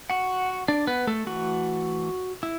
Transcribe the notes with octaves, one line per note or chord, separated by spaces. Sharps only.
F#4 F#5
D4 D5
B3 B4
A3 A4
E3 A3 F#4
E4